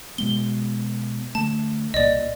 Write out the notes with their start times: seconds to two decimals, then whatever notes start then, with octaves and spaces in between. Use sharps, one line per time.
0.18 B2 G#3 B3 G7
1.35 D3 A3 A5
1.94 C2 A#2 D5 D#5